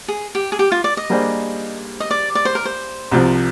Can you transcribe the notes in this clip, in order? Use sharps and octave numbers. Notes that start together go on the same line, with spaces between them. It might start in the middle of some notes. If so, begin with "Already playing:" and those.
G#4
G4
G#4
G4
F4
D5
D#5
G3 A#3 D4 G#4 C5
D#5
D5
D5
C5
A#4
C5
C2 C3 F3